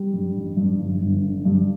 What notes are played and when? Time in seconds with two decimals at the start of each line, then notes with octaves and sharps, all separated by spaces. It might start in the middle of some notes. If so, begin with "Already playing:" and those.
Already playing: G3
0.14 G2
0.36 A1
0.57 G2
0.79 G1
1.01 G1
1.23 D3
1.45 G2